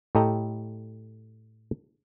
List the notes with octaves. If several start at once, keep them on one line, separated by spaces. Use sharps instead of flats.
A2 G4 A4 D#5 G5 A#5